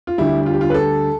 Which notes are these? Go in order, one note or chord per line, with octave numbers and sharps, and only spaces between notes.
F4
D2 D3 G3 E4
F4
G4
F4
B4
A4